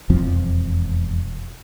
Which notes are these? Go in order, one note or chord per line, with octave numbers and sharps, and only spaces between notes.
E1 F2 F3 C4